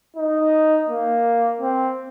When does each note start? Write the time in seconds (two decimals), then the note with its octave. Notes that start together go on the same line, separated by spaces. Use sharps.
0.16 D#4
0.89 A#3
1.61 C4